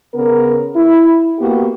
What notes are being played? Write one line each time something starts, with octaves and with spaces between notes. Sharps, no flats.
C#3 B3 A#4
E4
A#3 B3 F#4 G4